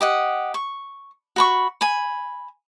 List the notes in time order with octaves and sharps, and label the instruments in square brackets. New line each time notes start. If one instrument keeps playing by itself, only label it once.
[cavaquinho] G4 D#5 F#5
C#6
F#4 B5 C#6
G#5 B5